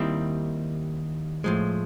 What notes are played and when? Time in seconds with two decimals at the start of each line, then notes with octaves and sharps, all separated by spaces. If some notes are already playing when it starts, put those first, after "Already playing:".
Already playing: D#2 D#3 G3 C4 E4
1.44 A2 F3 G#3